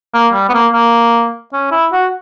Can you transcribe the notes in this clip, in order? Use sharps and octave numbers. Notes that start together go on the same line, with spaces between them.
A#3
G3
B3
A#3
A#3
C#4
E4
F#4